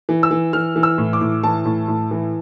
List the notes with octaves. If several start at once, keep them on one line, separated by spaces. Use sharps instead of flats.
E3
E6
E3
E3 F6
E3
E6
A2
D6
A2
E3 A5
A2
A2
E3